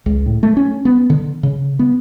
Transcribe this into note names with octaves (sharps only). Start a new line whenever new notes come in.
C#2
A2
A3
C#4
B3
D3
C#3
B3